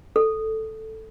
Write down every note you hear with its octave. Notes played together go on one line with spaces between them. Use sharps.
A4